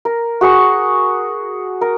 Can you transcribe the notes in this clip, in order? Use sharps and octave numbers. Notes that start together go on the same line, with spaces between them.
A#4
F#4 G#4 F#5 C#6
A#4